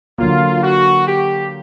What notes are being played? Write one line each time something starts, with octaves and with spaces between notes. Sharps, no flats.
D3 F#3 A#3 F4
F#4
G4